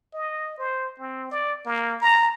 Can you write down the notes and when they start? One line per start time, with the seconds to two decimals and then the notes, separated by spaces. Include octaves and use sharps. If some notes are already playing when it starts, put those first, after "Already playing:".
0.13 D#5
0.58 C5
0.99 C4
1.31 D5
1.65 A#3
2.01 A#5